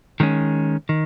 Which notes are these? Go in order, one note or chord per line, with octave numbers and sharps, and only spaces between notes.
D#3 G#3 C#4
D#3